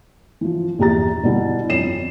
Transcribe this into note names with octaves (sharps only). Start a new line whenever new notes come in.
E3 F3
A#1 E2 G4 A#5 A6
B2 D3 G3 B3 E4
F2 C#5 C7 E7